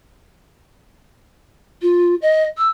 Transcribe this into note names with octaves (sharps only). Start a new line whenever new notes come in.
F4
D#5
E6